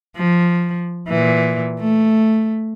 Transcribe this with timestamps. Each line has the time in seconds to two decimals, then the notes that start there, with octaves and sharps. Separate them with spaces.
0.16 F3
1.08 A#2 E3
1.80 A3